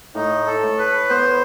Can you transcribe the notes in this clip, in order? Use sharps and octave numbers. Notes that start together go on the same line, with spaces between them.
A2 D#4
A4
A2
B4
B3 C5